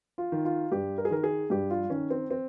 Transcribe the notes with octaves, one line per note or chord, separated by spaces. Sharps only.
F4
D#3
F4
G2 G4
A#4
G#4
D#3 A#4
G#4
G2 G4
F4
D#3 C#4
C4
C4